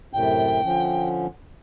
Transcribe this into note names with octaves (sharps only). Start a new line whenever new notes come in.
F#2 A2 C3 G5
D3 F3 C#4